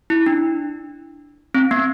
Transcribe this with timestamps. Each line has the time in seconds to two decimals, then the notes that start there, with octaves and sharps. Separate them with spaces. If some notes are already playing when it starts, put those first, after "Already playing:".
0.10 E4
0.26 D4
1.54 C4
1.71 B3